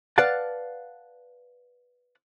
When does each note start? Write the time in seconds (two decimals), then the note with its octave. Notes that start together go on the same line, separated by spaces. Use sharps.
0.18 B4 D5 F5 F#5 A5